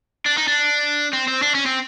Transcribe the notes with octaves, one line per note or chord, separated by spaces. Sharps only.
D4
D#4
D4
C4
C4
D4
C#4
C4